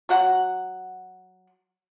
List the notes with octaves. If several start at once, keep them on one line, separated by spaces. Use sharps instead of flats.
F#3 F#4 F#5